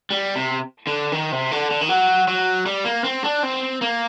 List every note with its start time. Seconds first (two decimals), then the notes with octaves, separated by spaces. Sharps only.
0.11 G3
0.36 C3
0.87 D3
1.12 D#3
1.32 C3
1.51 D3
1.71 D3
1.81 D#3
1.89 F#3
2.28 F#3
2.66 G3
2.85 A#3
3.04 C4
3.24 D4
3.43 C4
3.82 A#3